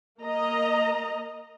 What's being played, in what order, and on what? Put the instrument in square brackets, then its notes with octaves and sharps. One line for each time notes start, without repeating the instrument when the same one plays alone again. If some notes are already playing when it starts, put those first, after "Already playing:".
[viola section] A#3 D#5 A#5